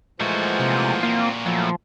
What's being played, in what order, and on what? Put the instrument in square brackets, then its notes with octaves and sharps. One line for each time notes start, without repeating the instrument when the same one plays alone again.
[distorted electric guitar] A#2 F#4 [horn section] E3 F3 [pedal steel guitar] G#3 A3
[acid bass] C3
[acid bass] A#3 [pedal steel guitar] C4 F4
[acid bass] F3 [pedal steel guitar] F#3 A3 E4